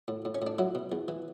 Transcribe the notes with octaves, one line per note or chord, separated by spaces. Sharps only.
A2
A2
C#4
A2 D4
F#3 E4
B2
E2
E3